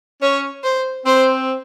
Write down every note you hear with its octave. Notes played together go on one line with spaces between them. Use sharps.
C#4 C#5
C5
C4 C5